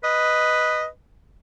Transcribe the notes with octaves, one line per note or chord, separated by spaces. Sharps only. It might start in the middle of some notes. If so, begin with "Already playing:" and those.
B4 D#5